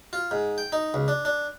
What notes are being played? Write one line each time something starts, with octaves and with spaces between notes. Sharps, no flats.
F4
G#2
G5
D#4
C#2
D4
D4